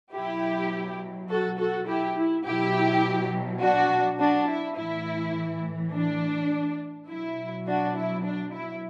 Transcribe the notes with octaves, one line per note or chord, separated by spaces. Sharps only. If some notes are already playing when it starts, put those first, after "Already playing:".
B2 F#3 E4 G4
F#4 A4
F#4 A4
E4 G4
E4
B2 F#3 E4 G4
D4 F#4
D4 F#4
E4
A2 E3 E4
D4
B2 F#3 E4
D4 F#4
E4
D4
E4